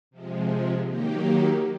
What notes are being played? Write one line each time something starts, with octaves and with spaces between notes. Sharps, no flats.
C3 F3 G#3
D#3 F#3 A#3 D#4 G4